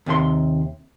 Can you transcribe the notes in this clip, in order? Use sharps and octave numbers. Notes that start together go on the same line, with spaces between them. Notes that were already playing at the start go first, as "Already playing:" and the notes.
D#2 C3 G#4 C6